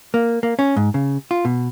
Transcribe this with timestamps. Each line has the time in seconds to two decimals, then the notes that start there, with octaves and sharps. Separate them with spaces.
0.14 A#3
0.43 A#3
0.59 C#4
0.76 G#2
0.94 C#3
1.31 F4
1.45 B2